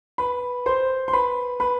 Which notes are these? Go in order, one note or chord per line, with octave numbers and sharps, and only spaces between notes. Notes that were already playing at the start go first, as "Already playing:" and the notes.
B4 B5
C5 C6
C6
B4 B5
B4 B5